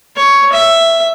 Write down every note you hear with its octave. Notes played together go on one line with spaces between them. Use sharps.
C#5
E5